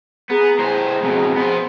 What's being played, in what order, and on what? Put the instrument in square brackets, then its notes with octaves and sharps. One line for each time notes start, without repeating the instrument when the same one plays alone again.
[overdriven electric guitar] B3 [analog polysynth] G#4 A#5
[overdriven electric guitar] A2 C5
F2 B2
B3 C5